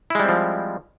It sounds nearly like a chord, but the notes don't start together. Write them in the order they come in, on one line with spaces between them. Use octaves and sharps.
E4 G#3 G3 C4 F3